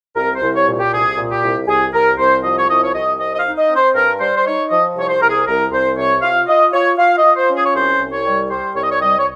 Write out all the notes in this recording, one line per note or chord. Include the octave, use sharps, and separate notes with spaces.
C2 A#4
C5
C2
C#5
A#2
G4
C2 G#4
A#2
G4
C2
C2 G#4
C2 A#4
C2 C5
F3 D#5
C#5
C2 D#5
C#5
C2 D#5
C4 D#5
D#5
F5
D#4
D#5
C4
C5
G2 A#4
G3 C5
C5
D#4 C#5
F3 D#5
C2 C#5
C5
C2 A#4
G#4
C2 A#4
C2 C5
C3 C#5
F4 F5
F4 D#5
F4 C#5
F4 F5
D#5
F4
C5
C#4
G#4
C#5
C2 C5
C2
C#5
G3
G3 C5
C2 C#5
D#5
C#5
G3 D#5
C#5